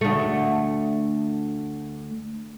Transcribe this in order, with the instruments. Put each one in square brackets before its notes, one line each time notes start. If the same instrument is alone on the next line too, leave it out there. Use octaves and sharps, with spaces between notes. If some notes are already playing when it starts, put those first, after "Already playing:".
[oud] D2 A3